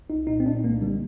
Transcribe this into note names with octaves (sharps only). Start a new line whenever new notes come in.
C2 D#4
A#2 D#4
C4
A#2 D4
C2 A#3
D3 G3